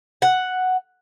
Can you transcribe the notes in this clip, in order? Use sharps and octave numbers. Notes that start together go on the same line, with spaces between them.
F#5